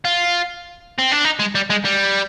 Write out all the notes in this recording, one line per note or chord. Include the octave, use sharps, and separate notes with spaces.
F4
C4
D4
D#4
G#3
G3
G#3
G3